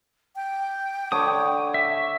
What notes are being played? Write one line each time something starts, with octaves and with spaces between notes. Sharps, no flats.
G5
D3 C#5 D6 D#6
E5